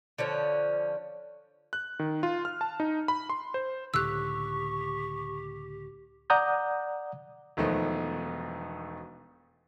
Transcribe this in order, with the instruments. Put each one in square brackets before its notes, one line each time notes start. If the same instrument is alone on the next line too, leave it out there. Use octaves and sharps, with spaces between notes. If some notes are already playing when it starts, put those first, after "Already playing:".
[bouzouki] D3 F3 C#4
[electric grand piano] F#6
D#3
F4
F6
A5
D#4
B5
C6
C5
[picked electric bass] C#2 A2 D3 [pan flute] G4 [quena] C#6 [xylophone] E6 F#6
[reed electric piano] D5 F#5 A#5 D#6 G6
[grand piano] E1 D#3 F3 A3 B3 D#4